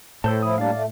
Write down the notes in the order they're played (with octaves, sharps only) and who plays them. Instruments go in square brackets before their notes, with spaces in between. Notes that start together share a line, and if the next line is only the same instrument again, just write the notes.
[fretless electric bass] A2 [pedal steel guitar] A4 C5 A5
[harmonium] F3 E4 [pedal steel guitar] D#6
[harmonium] G3 A#3 D4 [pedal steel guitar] D5 F5
[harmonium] A3